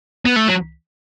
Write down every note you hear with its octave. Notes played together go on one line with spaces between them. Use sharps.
B3
A3
F#3